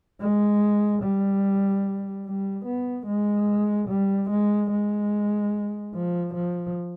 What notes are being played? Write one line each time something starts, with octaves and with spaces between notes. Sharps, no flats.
G#3
G3
G3
B3
G#3
G3
G#3
G#3
F3
F3